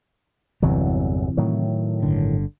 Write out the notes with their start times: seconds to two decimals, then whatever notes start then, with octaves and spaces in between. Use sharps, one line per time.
0.62 G1 E2 C3 E3 F#3
1.37 A2 D#3 F#3
2.03 G1 D3